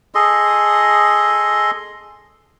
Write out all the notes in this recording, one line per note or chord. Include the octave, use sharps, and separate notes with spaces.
G#4 A4 D#5 C6